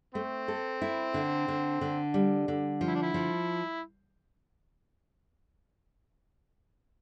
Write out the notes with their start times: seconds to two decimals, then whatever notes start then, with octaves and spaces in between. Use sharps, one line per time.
0.15 A3 C4
0.48 A4
0.82 E4
1.14 D3
1.48 D3
1.81 D3
2.14 G3
2.48 D3
2.81 F3
2.88 E4
2.95 D4
3.03 E4
3.14 F3